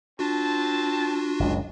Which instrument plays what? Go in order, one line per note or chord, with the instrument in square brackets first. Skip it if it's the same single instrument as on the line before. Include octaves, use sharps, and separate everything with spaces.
[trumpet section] C4 A5 [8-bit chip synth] D4 F4 F#4
[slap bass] F#1 C#2